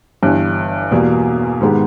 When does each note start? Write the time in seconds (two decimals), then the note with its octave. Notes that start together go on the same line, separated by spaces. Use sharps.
0.23 G1 G2 E3
0.91 E2 B2 G3 A#3
1.60 G#2 D#3 G#3 B3 G4